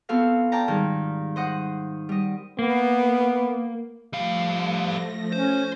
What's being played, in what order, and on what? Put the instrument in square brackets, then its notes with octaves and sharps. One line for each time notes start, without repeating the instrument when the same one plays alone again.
[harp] B3 C4 F4 F#4 A4 F5
D5 G5 A5 A#5
G#2 D#3 G3
C5 D#5 F#5
G3 D#5
[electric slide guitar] A#3 [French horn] B3
[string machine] F3 A3 [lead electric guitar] G3 F5
[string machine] F3 A3 A#6
[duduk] C#4 [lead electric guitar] C5 [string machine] G#5